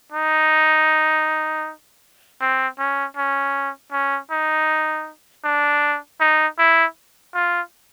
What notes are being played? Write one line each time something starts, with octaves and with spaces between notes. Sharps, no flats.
D#4
C4
C#4
C#4
C#4
D#4
D4
D#4
E4
F4